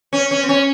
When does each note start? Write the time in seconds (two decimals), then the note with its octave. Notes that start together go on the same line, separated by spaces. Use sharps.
0.13 C#4
0.31 C#4
0.43 C4
0.49 C#4